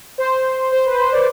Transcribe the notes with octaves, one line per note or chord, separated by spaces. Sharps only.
C5
C5
B4
C5
D5